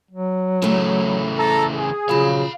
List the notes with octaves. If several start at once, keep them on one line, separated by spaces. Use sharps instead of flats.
F#3
C#3 E3 A3 E4
A4 A#5
G#4
C#3 F3 F#3 F5 B5